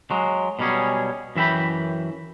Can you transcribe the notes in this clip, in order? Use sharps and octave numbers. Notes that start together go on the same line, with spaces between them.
F#3 G#3
B2 F#3 G3 C#4 G#4
F#2 E3 E5 G5 B5